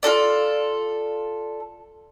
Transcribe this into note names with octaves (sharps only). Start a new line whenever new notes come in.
F4 F#4 A4 D5